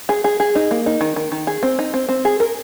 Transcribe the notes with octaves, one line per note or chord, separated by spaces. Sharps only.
G#4
G#4
G#4
D#4
A#3
D#4
D#3
D#3
D#3
G#4
C4
D#4
C4
C4
G#4
A#4